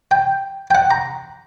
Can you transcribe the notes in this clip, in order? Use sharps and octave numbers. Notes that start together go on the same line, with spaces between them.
G5
G5
F#5
A#5